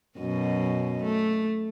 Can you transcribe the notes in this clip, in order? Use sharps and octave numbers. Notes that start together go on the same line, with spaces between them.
F#2 B2 D#5
A3